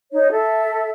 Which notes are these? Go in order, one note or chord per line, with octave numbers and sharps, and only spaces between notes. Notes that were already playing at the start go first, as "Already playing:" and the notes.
D#4 C#5
A4 E5